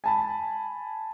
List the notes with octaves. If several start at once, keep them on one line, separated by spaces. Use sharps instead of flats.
G#5 A5 B5